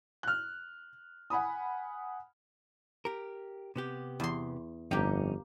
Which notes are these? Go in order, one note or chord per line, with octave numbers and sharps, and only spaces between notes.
F6 F#6
F#5 G#5 B5 D#6
G4 A#4
C3 B3 G4
E2 C6
G1 F2 A#3 C#4 D#4 G4